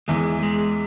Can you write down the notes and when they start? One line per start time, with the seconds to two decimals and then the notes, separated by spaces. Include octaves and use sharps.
0.08 E2 E3 G#3
0.43 G#3